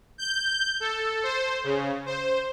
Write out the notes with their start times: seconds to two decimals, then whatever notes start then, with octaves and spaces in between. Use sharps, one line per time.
0.18 G6
0.80 A4
1.23 C5
1.64 C#3
2.06 C5